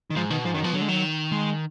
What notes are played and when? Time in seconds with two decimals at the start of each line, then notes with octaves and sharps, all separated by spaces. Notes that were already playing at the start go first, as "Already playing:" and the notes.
0.10 D#3
0.16 G#2 F3
0.30 B2 D#3
0.45 G#2 F3
0.54 F#2 D#3
0.64 B2 F3
0.74 D3 F#3
0.81 G#3
0.88 D#3 F#3
1.32 G#3